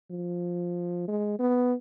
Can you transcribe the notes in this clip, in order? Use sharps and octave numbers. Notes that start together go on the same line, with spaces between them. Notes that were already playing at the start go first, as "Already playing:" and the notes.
F3
G#3
B3